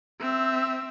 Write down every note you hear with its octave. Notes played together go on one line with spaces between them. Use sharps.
C4 E5